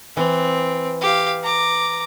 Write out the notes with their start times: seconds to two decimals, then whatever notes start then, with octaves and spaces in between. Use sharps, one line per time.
0.17 E3 C4
1.02 G4 F5
1.44 A#5 D6